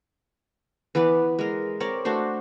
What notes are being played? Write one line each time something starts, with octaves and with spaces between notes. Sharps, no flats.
E3 B3 B4 D5
G#3 A#4
C4 A#4 C#5 D5
A3 D4 F#4 C5